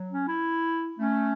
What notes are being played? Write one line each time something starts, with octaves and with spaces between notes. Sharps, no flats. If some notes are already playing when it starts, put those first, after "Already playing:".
Already playing: F#3
C#4
E4
A3 C#4